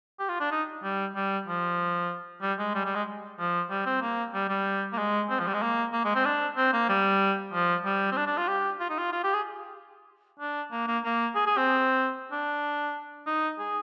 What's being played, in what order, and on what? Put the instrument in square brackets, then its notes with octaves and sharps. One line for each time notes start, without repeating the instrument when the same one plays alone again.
[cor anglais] G4
F4
D4
D#4
G3
G3
F3
G3
G#3
G3
G3
G#3
F3
G3
C4
A#3
G3
G3
A#3
G#3
C4
F3
G3
G#3
A#3
A#3
G#3
C4
D4
C4
A#3
G3
F3
G3
C4
D4
D4
F4
G4
F4
D#4
F4
F4
G4
G#4
D4
A#3
A#3
A#3
G#4
G#4
C4
D4
D#4
G#4